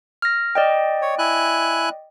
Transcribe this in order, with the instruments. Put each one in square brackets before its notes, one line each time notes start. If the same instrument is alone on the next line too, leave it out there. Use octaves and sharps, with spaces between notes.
[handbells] F6 A#6
D5 D#5 G5
[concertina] C#5
E4 G#5 F#6